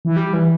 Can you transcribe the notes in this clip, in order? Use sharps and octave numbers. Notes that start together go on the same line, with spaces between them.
E3
G3
E3